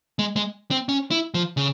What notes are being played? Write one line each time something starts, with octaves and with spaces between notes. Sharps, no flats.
G#3
G#3
C4
C#4
E4
F3
C#3